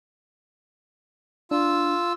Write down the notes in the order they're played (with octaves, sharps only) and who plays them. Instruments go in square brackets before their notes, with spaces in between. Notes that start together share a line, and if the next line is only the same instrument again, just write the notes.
[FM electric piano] D4 [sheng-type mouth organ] F4 E6